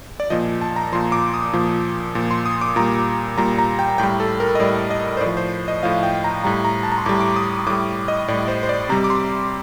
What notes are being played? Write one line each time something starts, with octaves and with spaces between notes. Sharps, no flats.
D5
A#2 F3 D#5
A5
A#5
A#2 F3 C6
D6
D#6
A#2 F3
A#2 F3
C6
D#6
D6
A#2 G3 A#5
A#2 G3 A#5
A#5
G5
A2 G3 G5
A4
A#4
D#5
A2 G3 D5
D#5
C5
A2 F3 D5
C5
D#5
A2 F3 F5
G5
A#5
A2 G3 A#5
A#5
A5
A#5
C6
A2 G3 D6
D6
D#6
A2 G3 D6
D#5
A2 G3 D5
C5
C5
D5
C3 G3 A#5
D6
C6